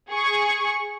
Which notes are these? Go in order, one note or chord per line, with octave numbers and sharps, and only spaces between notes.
G#4 C#6